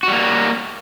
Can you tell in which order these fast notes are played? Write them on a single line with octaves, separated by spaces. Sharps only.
F#4 G3 A#3